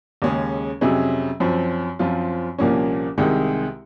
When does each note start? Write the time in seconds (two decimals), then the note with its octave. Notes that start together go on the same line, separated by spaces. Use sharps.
0.22 D#2 C#3 G#3 C#4 G#4
0.81 F2 C3 F#3 C#4 G#4
1.40 F#2 F3 C4
1.99 F#2 F3 C4 F4
2.58 C2 A#2 F3 A#3 C#4
3.18 C2 C3 D#3 G#3